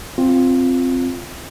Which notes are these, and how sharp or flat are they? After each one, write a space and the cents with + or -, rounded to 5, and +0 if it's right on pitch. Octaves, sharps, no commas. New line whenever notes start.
C4 +0 F4 +5